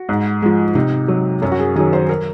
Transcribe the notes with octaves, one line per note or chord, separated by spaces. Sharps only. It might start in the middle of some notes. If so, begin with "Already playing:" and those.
Already playing: F#4
G#2
F3 G#3
C3 D#4
F#3
F#2 C#4
F#4
G#4
D#3 F#3 G#4
C5
A#4